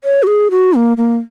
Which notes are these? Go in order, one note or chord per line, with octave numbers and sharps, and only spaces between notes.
C#5
F#4
G#4
F#4
A#3
A#3